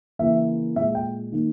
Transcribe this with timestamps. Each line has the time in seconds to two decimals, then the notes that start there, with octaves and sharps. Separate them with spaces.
0.19 C#3 E3 A#3 E5
0.76 A#2 E5
0.80 G#3
0.95 G5
1.32 D#3 A#3